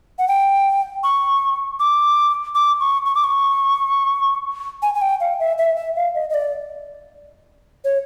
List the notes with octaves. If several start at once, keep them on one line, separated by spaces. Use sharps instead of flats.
F#5
G5
C#6
D6
D6
C#6
C#6
D6
C#6
G#5
G#5
G5
F5
E5
E5
E5
F5
D#5
D#5
D5
C#5